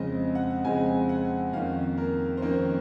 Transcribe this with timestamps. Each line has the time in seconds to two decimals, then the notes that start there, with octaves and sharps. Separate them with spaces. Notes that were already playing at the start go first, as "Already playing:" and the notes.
Already playing: F2 C#3 G#3 C4 D#5
0.35 F#5
0.65 F2 C#3 G#3 C4 G#5
1.09 F#5
1.53 F2 D#3 A#3 C#4 F5
1.98 A#4
2.37 C5
2.42 F2 D#3 A#3 C#4 A#4